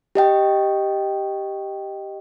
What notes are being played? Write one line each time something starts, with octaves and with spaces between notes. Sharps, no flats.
G4 D#5 G5